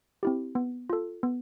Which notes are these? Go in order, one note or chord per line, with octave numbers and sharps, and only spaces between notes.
C4 E4 G4
B3
F4 A4
B3